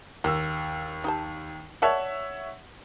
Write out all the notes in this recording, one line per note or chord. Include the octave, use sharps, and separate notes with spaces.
D#2 A#3 E6
D#4 G4 A5
A#4 C#5 D5 E5 F#5 A5